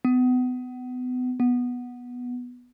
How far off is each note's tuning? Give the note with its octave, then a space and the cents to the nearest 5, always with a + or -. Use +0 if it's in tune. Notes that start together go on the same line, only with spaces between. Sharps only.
B3 +30
B3 -5